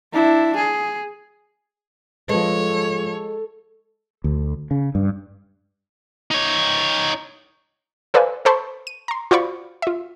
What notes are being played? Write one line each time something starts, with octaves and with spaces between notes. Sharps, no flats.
D4 E4
G#4
F3 G#3 A4 B4 C#5
D2
C#3
G2
D#4 C#5
A4 B4 C5 D5 F5 G#5
A4 B4 C5 A5 B5 C#6
D#7
A#5 C6
F4 F#4 C5 D5 B5 C#6
F4 E5